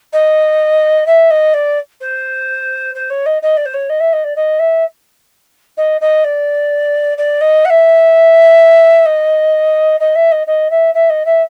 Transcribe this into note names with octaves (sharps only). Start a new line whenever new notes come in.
D#5
E5
D#5
D5
C5
C5
C#5
D#5
D#5
D5
C5
C#5
D#5
E5
D#5
D5
D#5
E5
D#5
D#5
D5
D5
D#5
F#5
E5
D#5
D#5
E5
D#5
D#5
E5
E5
D#5
E5